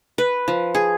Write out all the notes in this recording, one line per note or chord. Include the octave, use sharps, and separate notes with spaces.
B4
F3
G#4